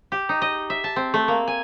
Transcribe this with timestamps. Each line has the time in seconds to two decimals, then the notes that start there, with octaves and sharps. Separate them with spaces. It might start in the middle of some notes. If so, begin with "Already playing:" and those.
0.12 G4
0.29 D#4
0.42 D#5
0.70 E5
0.84 A5
0.96 C4
1.14 A3
1.28 A#3
1.48 G#5